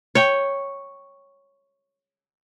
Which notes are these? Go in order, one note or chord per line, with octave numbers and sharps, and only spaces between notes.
C#5 G5